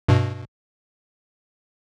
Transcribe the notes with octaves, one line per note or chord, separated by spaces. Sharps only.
G2 B2